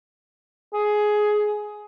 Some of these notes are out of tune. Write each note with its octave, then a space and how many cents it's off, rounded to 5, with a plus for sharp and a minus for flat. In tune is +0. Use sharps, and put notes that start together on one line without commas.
G#4 +15